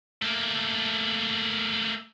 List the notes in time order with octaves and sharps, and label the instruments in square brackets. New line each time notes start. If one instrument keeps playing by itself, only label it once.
[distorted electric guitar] A3 A#3